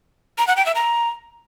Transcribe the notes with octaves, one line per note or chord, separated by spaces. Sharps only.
A#5
F#5
G5
E5
A#5